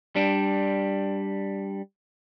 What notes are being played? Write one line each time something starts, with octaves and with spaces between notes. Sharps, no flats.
G3 D4